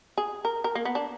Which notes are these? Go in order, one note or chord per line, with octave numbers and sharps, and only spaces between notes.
G#4
A#4
A#4
A#3
B3
D4